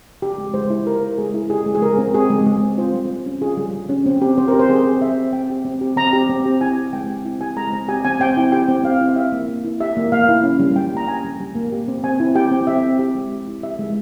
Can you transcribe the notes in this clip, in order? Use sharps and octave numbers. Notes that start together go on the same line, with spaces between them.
G4
G#3
G#3 C5
E4
G4 A#4
G#3
G#3 G#4
E4
G4 G#4
G#3
G#4
G#3 A#4
C4
G4 G#4
G#3
G#3 G#4
C4
F4 C5
G3
G3
C#4
F4 G#4
G3
G3
C#4
C4
G4
C4 C5
A#4
G4
C5
C4 G#4
G4 G#4
C4 E5
G4
C4 G5
G4
C4
G4
C4 A#5
G4
C4
G4
E4 G#5
G4
G#3 G5
C4
E4
G4 G#5
G#3 A#5
C4
G4 G#5
C4 G#5
C4 G5
E4
G4 G5
C4
C4 F5
E4
F5
G4 E5
A#3
A#3
E4
G4 E5
A#3
A#3 F5
E4
C#4
G3
G3 G5
A#3 A#5
C#4 G#5
G3
G3
A#3
G4
C4
C4 G#5
E4
G4 G5
C4
C4 E5
E4
G4
G#3
G#3
E4
G4 E5
G#3